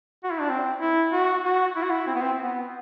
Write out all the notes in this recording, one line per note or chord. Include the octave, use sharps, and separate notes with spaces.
F#4
E4
D4
C4
E4
F#4
F#4
E4
F#4
E4
C4
B3
C4
B3